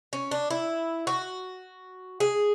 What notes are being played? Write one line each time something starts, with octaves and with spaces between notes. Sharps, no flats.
C#4
D4
E4
F#4
G#4